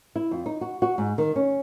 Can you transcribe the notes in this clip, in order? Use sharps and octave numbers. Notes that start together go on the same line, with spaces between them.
E4
F2
D#4
F#4
F#4
G#2
D#3
C#4